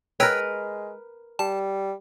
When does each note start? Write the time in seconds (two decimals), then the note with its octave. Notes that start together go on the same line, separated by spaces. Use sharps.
0.20 G#3 A#4 B4 C#5 G5 E6
1.39 G3 A5